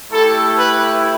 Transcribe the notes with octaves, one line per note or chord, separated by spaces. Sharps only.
A3 E4 G4 A4
B4